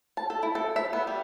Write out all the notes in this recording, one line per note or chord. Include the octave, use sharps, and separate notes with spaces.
A5
A4
E4
A4
E5
B3
G3